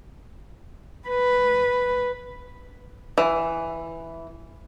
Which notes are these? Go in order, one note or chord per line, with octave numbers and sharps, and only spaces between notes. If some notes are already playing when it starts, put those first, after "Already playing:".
B4
E3